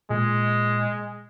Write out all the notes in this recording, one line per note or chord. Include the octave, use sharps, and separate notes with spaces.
A#2 G#3